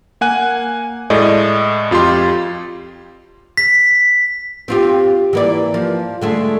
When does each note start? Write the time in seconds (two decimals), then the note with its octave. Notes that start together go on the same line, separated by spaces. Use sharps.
0.21 A#3 F#5 G#5 F#6
1.10 A2 G#3 A3 D5 D#5
1.91 F2 F4 G4 C6
3.57 B6
4.68 C4 F4 G4
5.33 E3 A#3 D5
5.74 F3
6.22 D3 G#3 A3